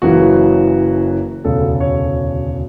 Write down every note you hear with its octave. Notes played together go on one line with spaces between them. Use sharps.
F#1 F#2 C#3 E3 F#4
E1 D2 C#3 A4
C#5